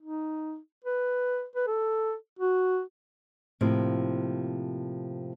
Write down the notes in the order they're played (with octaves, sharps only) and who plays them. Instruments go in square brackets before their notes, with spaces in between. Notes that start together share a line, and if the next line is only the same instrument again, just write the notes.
[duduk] D#4
B4
B4
A4
F#4
[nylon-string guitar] A2 C3 F3 A#3